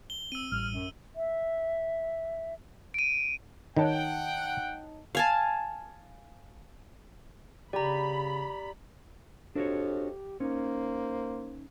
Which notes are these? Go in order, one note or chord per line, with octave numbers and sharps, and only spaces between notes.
G7
C4 E6 D#7
A1 A2 G3 F6
F#2
E5
D7 D#7
D#3 D#4 C#5 F#5 G5 A5
F5 G#5 A5
C#3 G4 D5 A#5 B5
F2 D4 F#4 G4 C#5
A#3 C#4 D#4 C5